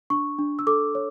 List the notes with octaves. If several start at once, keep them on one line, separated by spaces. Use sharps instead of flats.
D4 C#6
D4
E6
A4 D6
C#5